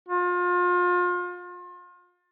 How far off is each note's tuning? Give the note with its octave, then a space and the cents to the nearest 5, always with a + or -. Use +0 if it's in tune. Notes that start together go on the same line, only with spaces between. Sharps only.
F4 +35